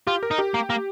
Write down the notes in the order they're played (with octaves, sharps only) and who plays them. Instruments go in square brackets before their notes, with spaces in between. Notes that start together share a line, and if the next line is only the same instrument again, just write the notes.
[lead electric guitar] F4 [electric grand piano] G4
[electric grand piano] A#4
[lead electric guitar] D#4
[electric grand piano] G4
[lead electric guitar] A#3
A#3